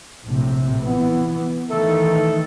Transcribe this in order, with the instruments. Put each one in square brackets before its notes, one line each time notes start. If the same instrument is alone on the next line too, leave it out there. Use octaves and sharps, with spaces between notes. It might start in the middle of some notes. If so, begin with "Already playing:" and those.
[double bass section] A#1 A2 C3
E3 B3
[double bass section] D#3 E3 [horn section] A3 A4